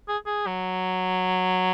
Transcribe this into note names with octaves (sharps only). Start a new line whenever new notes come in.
G#4
G#4
F#3